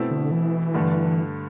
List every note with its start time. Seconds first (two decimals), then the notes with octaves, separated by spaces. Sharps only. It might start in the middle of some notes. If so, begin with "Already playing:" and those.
Already playing: B2 A3 C4 E4
0.11 D3
0.31 E3
0.74 G2 D3 A3